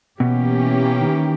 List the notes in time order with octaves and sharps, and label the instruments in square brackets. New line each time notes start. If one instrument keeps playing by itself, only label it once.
[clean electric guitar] B2 [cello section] E3 A#3 C#4 G4
[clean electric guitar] D#3